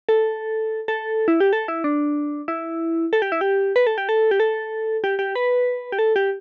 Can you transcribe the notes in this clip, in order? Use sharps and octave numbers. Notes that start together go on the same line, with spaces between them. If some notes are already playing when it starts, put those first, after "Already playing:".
A4
A4
E4
G4
A4
E4
D4
E4
A4
G4
E4
G4
B4
A4
G4
A4
G4
A4
G4
G4
B4
G4
A4
G4